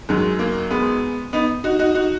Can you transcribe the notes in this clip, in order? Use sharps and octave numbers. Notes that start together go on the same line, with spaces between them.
F#2 D#3 F#3 G#3
A#3
G#3 B3
B3 D#4
D#4 F#4
D#4 F#4
D#4 F#4